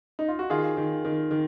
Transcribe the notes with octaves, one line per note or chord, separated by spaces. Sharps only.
D#4
F4
F#4
D#3 F4 G#4
D#3
D#3
D#3